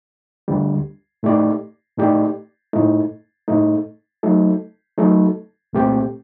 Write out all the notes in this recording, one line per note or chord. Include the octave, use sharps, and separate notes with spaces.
D2 D3 G3
A2 A3 D#4 G4 D5
A2 A3 D#4 G4 D5
A2 A3 D#4
A2 A3 D#4
F#3 A3 D#4 A4
F#3 A3 D#4 A4
C2 A#2 A3 C4 G4